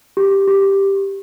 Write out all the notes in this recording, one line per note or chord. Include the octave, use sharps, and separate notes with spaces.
G4
G4